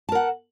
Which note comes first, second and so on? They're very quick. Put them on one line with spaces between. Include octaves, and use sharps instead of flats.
A5 A#4 F#5